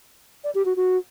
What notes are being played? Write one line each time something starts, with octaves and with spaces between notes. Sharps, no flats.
D5
G4
F#4
F#4